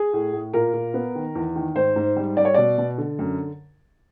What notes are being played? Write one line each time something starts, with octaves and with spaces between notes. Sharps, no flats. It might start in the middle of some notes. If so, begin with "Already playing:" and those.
Already playing: G#4
A2
A2
A#2 A#4
A#2
B3
D#3
E2
D#3
G#2 C5
G#2
G3
G3 D5
C#5
B2 D5
B2
D3
F#2